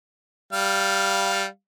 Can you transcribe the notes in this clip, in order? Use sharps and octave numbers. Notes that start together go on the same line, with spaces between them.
G3 F5